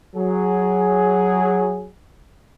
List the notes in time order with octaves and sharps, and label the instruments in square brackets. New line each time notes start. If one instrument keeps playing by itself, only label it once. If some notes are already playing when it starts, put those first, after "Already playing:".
[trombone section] F#3 G#4